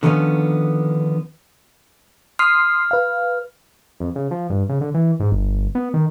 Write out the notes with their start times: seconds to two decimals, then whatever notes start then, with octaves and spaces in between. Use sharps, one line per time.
0.03 D3 D#3 F3 B3 C#4
2.39 C6 D#6 F6 C7
2.91 B4 F5
4.00 F2
4.16 C#3
4.31 F3
4.50 G2
4.69 C#3
4.81 D3
4.94 E3
5.20 G#2
5.32 G1
5.75 B3
5.94 D#3